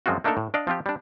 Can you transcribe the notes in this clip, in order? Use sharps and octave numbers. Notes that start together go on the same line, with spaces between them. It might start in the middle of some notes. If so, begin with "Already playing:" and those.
F#2 F3 G#3 C4 F4 F#4
A3 A#3 D4 D#4 A4 A#4
A2
D4 D5 D#5 F5
F3 C4 F4 G4
G3 D4